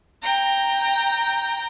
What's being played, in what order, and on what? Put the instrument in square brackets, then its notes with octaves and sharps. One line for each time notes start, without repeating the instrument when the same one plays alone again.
[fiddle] G5 A#5